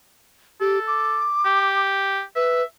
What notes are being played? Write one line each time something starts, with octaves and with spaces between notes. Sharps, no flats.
G4 A4
D6
G4
B4 E5